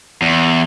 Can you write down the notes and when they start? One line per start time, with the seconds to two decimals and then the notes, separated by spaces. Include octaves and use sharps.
0.22 E2